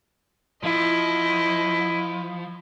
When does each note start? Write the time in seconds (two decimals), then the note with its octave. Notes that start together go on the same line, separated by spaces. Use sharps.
0.63 F3 E4 D#5